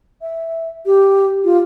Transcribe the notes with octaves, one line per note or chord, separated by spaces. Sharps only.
E5
G4
F4